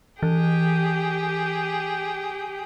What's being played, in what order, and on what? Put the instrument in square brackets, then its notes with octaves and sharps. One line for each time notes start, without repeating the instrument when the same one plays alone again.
[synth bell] E3 [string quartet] G4 G#4 G5